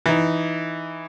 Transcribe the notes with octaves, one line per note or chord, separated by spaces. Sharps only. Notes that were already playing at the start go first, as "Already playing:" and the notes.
E3 D#4